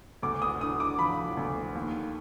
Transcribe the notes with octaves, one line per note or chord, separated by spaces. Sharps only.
D2 D6
D#6
D3 D#6
D6
F3 B5
D2
D#2